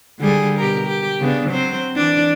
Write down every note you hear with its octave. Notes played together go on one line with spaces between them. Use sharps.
D3 G3 G#4
B2 G4 A#4
G4
C#3 B3 D4
F#3 C4 C5
E3 D4 D5